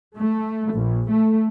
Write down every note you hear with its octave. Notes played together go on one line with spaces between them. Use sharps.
A3
A#1
A3